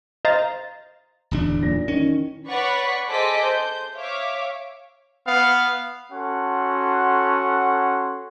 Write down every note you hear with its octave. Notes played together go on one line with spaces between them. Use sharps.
C5 D#5 F5 A#5 A6
D1 E2 D4
B1 A#2 A#6
D#3 E3 C#4
B4 C#5 D5 F#5 B5 C#6
G#4 A4 C5 D#5 D6 B6
C5 G6
C#5 E5 F5 D6
B3 F5
C#4 F#4 A4 F#5 C6